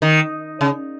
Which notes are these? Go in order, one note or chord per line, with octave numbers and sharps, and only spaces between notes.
D#3
C#3